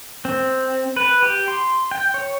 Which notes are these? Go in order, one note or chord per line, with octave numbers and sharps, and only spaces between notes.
C4
B4
G4
C6
G5
C#5